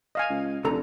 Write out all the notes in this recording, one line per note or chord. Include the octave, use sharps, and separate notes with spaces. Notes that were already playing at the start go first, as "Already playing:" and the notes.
D#5 F5 G#5
C#2
F1 D3 A4 A#5